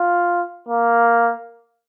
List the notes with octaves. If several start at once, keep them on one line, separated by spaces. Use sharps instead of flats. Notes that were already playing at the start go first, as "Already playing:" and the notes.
Already playing: F4
A#3